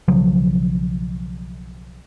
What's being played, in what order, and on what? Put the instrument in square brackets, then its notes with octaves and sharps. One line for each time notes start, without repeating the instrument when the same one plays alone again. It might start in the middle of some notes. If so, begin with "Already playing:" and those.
[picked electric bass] B1 C#3 F3 F#3